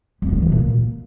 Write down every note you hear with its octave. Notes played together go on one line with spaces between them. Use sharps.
F2
D3
E3
A#2